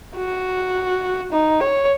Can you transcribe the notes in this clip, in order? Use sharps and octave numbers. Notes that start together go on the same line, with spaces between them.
F#4
D#4
C#5